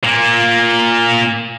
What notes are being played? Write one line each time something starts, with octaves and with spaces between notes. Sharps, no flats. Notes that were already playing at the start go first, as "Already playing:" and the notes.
A#2 A#3